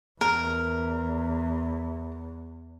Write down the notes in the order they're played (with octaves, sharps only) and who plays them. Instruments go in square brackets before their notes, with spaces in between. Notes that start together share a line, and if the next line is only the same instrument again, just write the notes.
[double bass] E2 [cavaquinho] A#4